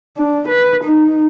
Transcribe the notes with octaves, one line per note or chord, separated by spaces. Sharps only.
D4
B4
D#4